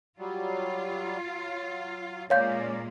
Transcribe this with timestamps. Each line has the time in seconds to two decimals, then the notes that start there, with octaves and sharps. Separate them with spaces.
0.19 F#3 G3 F4
1.24 F#3 F5
2.30 A#2 G#3 A#3 C#4 C#5 D5 F5 G6